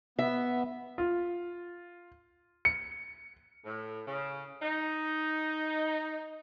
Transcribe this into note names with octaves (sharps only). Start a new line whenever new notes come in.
B3 E5
F4
C#7
A2
C#3
D#4